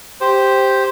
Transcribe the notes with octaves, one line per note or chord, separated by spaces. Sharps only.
G4 C5